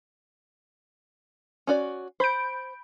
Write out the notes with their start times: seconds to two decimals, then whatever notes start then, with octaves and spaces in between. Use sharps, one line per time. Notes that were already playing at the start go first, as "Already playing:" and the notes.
1.67 C#4 F#4 D5
2.20 C5 B5 G6 D7